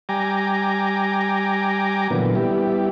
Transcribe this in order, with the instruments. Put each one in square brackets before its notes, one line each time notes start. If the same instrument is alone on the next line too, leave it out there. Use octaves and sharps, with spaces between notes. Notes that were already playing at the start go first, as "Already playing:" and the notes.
[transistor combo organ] G3 G5 G#5 A#5 D6
A#2 D3 E3 F#3 B3
G3 B3 E4 G4